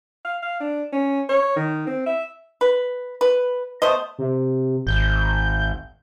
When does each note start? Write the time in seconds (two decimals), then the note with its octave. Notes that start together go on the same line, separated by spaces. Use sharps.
0.25 F5
0.43 F5
0.61 D4
0.92 C#4
1.29 C#5
1.56 D#3
1.87 C4
2.06 E5
2.61 B4
3.21 B4
3.82 A3 B3 C5 D#5
4.18 C3
4.87 G#1 G6